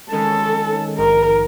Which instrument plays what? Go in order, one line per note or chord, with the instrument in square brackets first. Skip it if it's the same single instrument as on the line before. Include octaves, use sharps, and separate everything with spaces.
[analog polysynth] D#3 G#3 C#4 [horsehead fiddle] A4
[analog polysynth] A#1 G#2 D#3 [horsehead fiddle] A#4